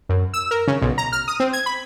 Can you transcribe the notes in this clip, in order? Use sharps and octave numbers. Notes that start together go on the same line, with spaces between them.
F#2
E6
A#4
C#3
B1
A#5
F6
D#6
C4
G#6
B5